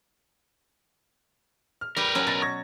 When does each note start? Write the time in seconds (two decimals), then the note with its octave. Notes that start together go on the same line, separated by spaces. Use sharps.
1.81 F6
1.97 G3 G4 A#4 B4
2.15 F#3 C#4
2.27 B2 B5 A6 A#6
2.42 C#6 G#6 A#6